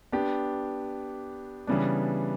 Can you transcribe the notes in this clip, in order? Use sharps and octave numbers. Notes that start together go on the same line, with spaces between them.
B3 D4 G4
C#3 E3 G3 B3 D4